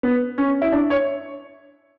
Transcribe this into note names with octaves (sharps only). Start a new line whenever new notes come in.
B3
C#4
E4
D4
C#5